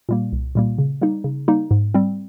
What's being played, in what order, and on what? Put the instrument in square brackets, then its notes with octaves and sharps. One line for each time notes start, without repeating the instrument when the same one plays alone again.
[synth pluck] A#2 G3 A#3
C2
A#2 G3 A#3
C#3
G3 A#3 D#4
C#3
G3 A#3 D#4
G#2
G3 C4